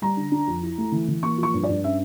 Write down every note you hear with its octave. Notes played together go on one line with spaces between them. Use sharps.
G3 A#5
D3
D4
F2
E4
A3
E3
E3
A#3 C#6
F3
C#6
G2
D5
G2
C#4 E5